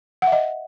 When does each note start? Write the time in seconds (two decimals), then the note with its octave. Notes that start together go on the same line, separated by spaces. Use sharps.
0.22 F#5
0.27 E5
0.32 D#5